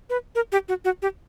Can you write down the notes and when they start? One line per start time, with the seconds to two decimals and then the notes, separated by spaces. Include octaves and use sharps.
0.10 B4
0.35 A#4
0.52 G4
0.68 F#4
0.85 F#4
1.02 G4